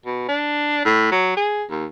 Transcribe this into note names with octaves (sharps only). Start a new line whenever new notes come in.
B2
D4
A2
F#3
G#4
D#2